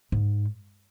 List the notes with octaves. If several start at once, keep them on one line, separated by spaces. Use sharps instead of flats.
G#2